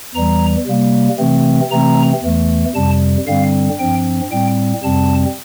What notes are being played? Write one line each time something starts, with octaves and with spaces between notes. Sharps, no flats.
E2 E3 G3 A#5
C3 G3 A#3
C3 E3 A3 C4
C3 E3 A3 C4 A#5
E2 E3 A3
F2 C3 G3 A5
G2 D3 G3 C4 F5
G2 F3 C4 G5
A2 G3 C4 G5
F2 C3 G3 C4 A5